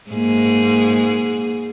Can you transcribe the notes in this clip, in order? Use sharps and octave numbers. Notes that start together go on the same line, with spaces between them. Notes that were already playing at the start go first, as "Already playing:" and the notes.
G#2 A#3 G#4